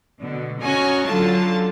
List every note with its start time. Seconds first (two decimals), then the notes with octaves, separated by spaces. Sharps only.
0.20 B2 D3
0.60 C#4 F#4 D#5 G#5 A#5 C#6
1.04 D3 F#3 F4 A5